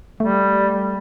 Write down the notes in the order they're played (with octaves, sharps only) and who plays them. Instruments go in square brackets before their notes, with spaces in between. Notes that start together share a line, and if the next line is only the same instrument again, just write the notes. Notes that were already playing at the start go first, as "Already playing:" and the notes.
[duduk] G3 [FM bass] A3